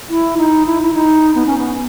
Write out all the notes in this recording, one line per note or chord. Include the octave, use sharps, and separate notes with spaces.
E4
D#4
E4
E4
D#4
B3
C#4
B3